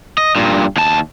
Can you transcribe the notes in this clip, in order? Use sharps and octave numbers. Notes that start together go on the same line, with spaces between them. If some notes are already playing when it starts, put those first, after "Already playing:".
D#5
G2 A#2
D#2 A5